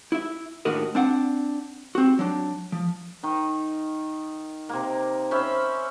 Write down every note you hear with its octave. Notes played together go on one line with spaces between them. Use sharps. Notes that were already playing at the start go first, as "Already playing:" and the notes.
E4 E5
D#2 A2 D4 F#4 A#4 D#5
C4 D4 F#5
C4 F#4
F#3 D4
F3
D#3 D#4
C3 A#3
C#4 C5 E5 B5